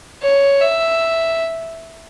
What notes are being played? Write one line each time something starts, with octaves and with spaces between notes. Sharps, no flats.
C#5
E5